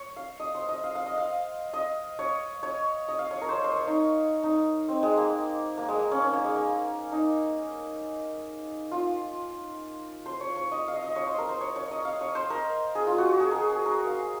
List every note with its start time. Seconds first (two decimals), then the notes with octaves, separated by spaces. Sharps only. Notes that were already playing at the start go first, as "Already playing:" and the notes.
Already playing: C#5
0.16 F5
0.40 D#5
0.55 C5
0.69 D#5
0.84 F5
0.95 F5
1.06 D#5
1.18 F5
1.74 D#5
2.19 C#5
2.63 C#5
3.08 D#5
3.19 F5
3.31 C#5
3.41 A#4
3.49 C5 C#5
3.64 C5
3.76 C#5
3.87 D#4
4.43 D#4
4.88 C4
5.03 G#3
5.17 A#3
5.78 A#3
5.88 G#3
5.99 A#3
6.11 C#4
6.22 C#4
6.33 A#3
6.44 G#3
6.56 A#3
7.12 D#4
8.92 F4
10.26 C5
10.40 C#5
10.56 C#5
10.72 D#5
10.88 F5
10.94 D#5
11.04 D#5
11.16 C#5
11.27 C5
11.38 A#4
11.49 C5
11.61 C#5
11.76 C#5
11.91 D#5
12.05 F5
12.21 C#5
12.35 C5
12.50 A#4
12.95 G#4
13.07 F4
13.18 F#4
13.29 F#4
13.40 G#4
13.51 G#4 A#4
13.70 G#4
13.86 A#4
14.07 F5